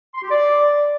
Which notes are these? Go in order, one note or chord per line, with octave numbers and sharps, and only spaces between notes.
C6
G4
D5